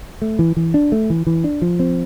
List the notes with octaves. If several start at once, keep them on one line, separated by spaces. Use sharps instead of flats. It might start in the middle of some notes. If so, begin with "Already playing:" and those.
A3
E3
E3
D4
A3
E3
E3
D4
F3
C4